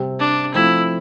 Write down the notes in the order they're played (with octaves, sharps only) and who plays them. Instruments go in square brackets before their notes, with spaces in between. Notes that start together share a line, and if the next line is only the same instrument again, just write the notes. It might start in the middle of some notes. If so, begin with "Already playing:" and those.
Already playing: [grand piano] C3 G3 C4
[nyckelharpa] D4
[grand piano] F3 A3 C4 F4 [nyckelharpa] E4